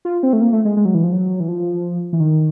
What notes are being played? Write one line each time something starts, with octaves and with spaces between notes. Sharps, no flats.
F4
C4
A3
A#3
A3
G#3
G#3
F#3
E3
F3
F#3
E3
F3
E3
D#3